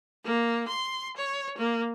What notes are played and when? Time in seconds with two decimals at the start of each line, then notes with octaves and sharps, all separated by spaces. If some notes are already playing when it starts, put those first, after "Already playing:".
0.25 A#3
0.68 C6
1.17 C#5
1.58 A#3